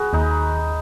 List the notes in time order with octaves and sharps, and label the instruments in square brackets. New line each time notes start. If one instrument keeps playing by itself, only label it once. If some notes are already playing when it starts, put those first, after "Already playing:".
Already playing: [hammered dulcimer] F#4 G#4 B4
[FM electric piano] D#2 [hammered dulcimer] D#4